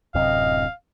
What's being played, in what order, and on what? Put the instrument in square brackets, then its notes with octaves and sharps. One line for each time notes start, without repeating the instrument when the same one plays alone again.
[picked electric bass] D1 F#2 C3 [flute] D#5 [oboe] F5